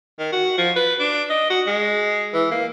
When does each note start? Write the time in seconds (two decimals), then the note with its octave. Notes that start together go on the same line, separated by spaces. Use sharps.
0.19 D#3
0.32 F#4
0.58 F3
0.76 B4
0.99 D4
1.30 D#5
1.50 F#4
1.66 G#3
2.34 E3
2.51 A#3